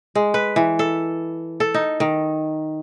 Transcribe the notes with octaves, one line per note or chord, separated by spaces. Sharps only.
G#3
B4
E3
A4
A4
D#4
D#3